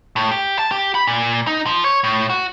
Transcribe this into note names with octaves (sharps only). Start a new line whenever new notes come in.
A2
G4
A5
G4
B5
A#2
D#4
F3
C#5
A2
F#4